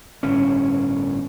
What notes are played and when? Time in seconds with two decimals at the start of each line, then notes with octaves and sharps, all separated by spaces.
0.23 G1 A2 C#4